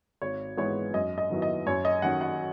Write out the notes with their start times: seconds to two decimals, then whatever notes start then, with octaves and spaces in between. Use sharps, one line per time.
0.22 G#1 C#5
0.57 G#2 E3 G#3 B3 C#5
0.93 F#2 D#5
1.18 D#5
1.30 D#3 F#3 B3 E4
1.42 D#5
1.66 F#2 C#5
1.85 D#5
2.02 D#3 F#3 C#4 F#5
2.21 F#5